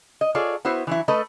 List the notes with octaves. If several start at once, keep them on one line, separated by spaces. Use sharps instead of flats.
D#5
F4 G#4 A4 C#5 D5
B3 E4 F#4 C5
E3 F#3 E4
A3 A4 B4 D#5